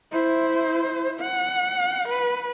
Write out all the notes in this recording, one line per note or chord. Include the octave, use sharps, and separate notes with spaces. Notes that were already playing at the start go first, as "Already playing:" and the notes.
E4 C5
F#5
B4